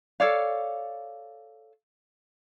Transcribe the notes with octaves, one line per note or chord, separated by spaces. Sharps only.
A4 C#5 D5 F5